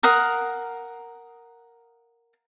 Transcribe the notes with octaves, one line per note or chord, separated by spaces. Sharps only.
A#4 F5 F#5 D#6